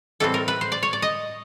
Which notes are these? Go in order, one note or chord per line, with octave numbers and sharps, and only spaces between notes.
A2 E3 G3 C4 A4
A#4
B4
C5
D5
C#5
D5
D#5